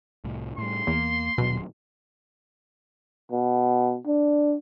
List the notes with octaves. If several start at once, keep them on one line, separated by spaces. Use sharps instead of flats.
C2 A2
A2 G3 C6
E2 A#3
D#1 B2 F#3
B2
D4